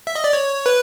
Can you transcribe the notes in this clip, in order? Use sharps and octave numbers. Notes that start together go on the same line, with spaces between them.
E5
D#5
D5
C#5
B4